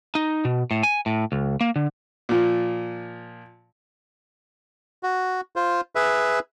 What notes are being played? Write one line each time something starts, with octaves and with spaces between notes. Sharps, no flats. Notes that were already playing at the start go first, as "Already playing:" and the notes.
D#4
B2
A2
G#5
A2
C#2
A#3
D3
A#2 F3
F#4
F4 C5
G#4 B4 E5